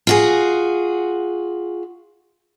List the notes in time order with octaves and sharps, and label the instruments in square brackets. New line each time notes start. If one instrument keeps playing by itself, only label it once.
[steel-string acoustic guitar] F4 F#4 G#4